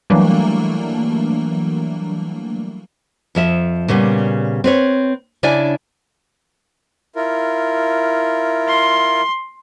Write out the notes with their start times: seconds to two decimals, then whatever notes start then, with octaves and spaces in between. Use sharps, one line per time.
0.10 E3 F#3 G3 A3 A#3 D4
3.35 F2 F3 E5
3.88 A#2 C#3 G3 B3
4.64 C4 B4 C#5
5.43 C#3 D4 E4 D5 G#5
7.16 E4 F4 A#4
8.68 C6